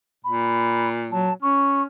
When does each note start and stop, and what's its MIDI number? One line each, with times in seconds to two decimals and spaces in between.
0.24 1.38 46
0.24 0.89 83
1.12 1.31 54
1.12 1.34 81
1.42 1.85 61
1.42 1.83 85